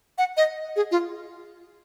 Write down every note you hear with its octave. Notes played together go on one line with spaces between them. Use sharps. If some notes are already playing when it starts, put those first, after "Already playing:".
F#5
D#5
G#4
F4